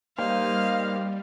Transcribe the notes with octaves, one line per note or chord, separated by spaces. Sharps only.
G3 A#3 D#4 C5 D#5 F5